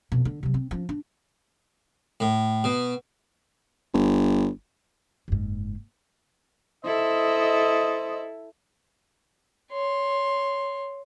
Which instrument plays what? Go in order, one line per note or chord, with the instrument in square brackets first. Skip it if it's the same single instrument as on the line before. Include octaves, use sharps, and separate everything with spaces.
[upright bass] F2 B2
D3
C3 F#3
C4
F3 C#4
D4
[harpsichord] A2
B2
[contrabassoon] G1
[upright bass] F#1 G#2
[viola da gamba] E4 A4 [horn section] C5 D#5
[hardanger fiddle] C#5 C6